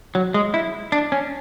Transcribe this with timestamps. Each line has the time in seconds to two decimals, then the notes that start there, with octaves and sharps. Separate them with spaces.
0.15 F#3
0.34 G#3
0.54 E4
0.92 D4
1.12 C#4